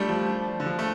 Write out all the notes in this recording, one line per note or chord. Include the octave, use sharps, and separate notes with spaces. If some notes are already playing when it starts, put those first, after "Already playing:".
Already playing: G3 A3 D4 F4
F3
D3
F3
A3